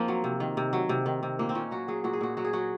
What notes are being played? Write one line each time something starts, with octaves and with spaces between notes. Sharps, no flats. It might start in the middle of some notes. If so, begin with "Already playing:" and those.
Already playing: F3 A#3 C4 D#4
F#3
C3
D#3
C3
F#3
C3
D#3
C3
A#2 A#3
C4
A#2 C#4
F#3 F#4
F#3 G#4
A#2 F#4
G#4
A#2 F#4
F#3 F#4
G#4
F#3 F#4